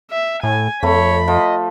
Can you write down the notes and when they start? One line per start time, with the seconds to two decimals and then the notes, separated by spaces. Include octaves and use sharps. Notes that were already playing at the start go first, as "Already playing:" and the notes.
0.10 E5
0.43 A2 G#5
0.83 F2 A3 C#5 B5
1.28 F3 D#5